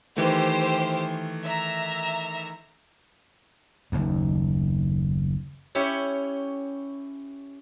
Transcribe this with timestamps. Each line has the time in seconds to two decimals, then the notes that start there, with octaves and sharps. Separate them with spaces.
0.17 D#3 E3 A3 G4 C5
1.44 E5 A#5
3.92 F#1 D#2
5.75 C#4 E4 G4 C#5